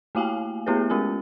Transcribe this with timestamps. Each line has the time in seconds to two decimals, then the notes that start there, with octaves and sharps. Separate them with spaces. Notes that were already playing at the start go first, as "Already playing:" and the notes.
0.15 A3 A#3 E4 F5 G5 G#5
0.67 A3 B3 E4 G4 G#4 B4
0.90 G#3 C#4 F4 G4 G#5